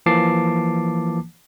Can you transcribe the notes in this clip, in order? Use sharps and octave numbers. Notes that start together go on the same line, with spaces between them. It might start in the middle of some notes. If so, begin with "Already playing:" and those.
E3 F3 A#3 A5 D6 C7